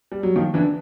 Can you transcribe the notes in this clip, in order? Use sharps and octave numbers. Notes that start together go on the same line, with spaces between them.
G3
F#3
D#3 F3
D3 E3